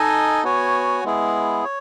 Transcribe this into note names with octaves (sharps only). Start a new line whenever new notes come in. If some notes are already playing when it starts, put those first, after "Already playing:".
Already playing: D#4 A4 D#5 G#5
B3 F#4 C#5 G#5
G#3 B3 E4 G#4
C#5